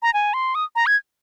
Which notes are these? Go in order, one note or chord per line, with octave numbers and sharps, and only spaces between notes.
A#5
G#5
C6
D#6
A#5
G#6